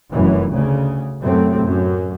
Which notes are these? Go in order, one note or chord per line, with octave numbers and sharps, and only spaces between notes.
F1 F#2 E3
D2 C#3
F#2 A2 C3 F#3 A3 C4
F#2